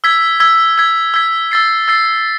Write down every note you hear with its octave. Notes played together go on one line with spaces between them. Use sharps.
E6 G#6 B6
E6 G#6 B6
E6 G#6 B6
E6 G#6 B6
E6 A6 C7
E6 A6 C7